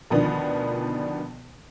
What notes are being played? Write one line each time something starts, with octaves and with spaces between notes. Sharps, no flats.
D2 B2 D#3 F3 B3 D4